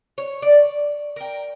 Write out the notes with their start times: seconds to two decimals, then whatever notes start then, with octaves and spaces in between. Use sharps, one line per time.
0.18 C#5
0.42 D5
1.16 A#4 G5